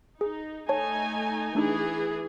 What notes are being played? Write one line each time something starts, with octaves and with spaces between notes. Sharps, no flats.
D#4 G#4
A3 D#4 C#5 G#5 A5
E3 A3 D4 D#4 G#4